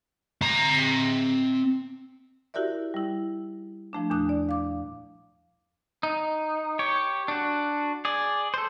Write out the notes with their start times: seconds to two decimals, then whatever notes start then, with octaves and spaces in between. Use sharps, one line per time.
0.41 C4 A#5
2.54 E4 F#4 G4 A#4 D5 E5
2.94 G3 E4
3.93 F3 A3 D4
4.10 E2 A#2 D4 D#6 F#6
4.29 D5
4.49 F5 D6
6.03 D#4
6.79 G4 C#5
7.28 D4 F#4
8.05 G#4 D5
8.54 A4 C5